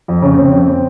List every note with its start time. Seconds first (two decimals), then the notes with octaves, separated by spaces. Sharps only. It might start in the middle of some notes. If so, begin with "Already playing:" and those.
0.08 F2
0.22 C#3 C#4
0.34 C4
0.38 C#3
0.45 C4
0.52 F2
0.68 C4